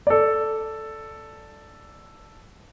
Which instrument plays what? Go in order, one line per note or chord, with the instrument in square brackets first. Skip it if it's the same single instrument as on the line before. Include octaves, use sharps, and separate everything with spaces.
[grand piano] A4 D5